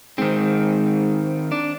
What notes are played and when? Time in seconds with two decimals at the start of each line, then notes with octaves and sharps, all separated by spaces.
0.18 G#2 D#3 C4
1.52 D4